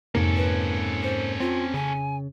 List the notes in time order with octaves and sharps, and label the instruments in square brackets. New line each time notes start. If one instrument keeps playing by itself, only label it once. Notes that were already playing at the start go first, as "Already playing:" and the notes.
[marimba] F2 [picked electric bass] G#2 C3 A#3 [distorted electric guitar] C#4 A4
[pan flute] B4
C5
[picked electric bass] C4 [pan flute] F4
[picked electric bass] C#3 [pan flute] G#5